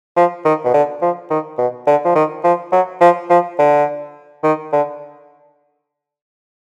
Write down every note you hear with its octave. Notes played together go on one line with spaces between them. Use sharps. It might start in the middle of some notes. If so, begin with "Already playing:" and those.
F3
D#3
B2
D3
F3
D#3
B2
D3
F3
D#3
F3
F#3
F3
F3
D3
D#3
D3